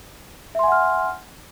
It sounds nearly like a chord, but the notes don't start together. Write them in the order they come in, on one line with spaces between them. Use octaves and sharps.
E5 C6 G#5 F#5 F6